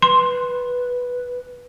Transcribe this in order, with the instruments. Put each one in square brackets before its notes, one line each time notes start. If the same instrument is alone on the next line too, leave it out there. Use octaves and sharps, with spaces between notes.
[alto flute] B4 [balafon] C6